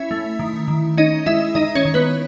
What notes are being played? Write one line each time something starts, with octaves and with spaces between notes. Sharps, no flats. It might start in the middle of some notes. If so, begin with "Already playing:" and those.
Already playing: C#4 E4 E5
A3
D#3
D#3
C#4 D#4 D#5
G#3 E4 E5
D#3 D#4 D#5
C#4 C#5
D#3
B3 B4